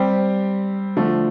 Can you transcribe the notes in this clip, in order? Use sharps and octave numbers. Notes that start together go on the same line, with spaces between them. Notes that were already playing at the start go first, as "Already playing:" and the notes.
Already playing: G3 C4 G4
D3 F3 A3